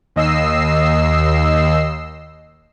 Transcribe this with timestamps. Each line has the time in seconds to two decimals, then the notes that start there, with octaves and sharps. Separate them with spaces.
0.16 D#2 D#5 E6 C7